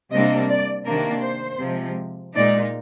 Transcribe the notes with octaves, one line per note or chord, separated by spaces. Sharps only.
C3 G3 A#3 D4 D#5
D5
C3 D#3 A#3 D4 A#4
C5
C3 F3 G#3
A#2 G#3 D#4 D5